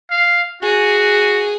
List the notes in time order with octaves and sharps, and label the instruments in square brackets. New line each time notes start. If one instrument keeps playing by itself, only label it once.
[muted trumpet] F5
[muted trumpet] F#4 [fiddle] G#4